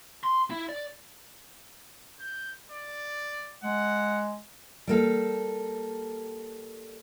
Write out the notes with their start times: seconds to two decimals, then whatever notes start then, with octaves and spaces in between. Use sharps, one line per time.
0.24 C6
0.50 E4
0.69 D5
2.20 G6
2.72 D5
3.64 G#3 F#5
4.87 G3 A#3 A4